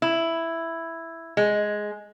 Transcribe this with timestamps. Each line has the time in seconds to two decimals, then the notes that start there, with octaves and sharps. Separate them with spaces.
0.02 E4
1.37 G#3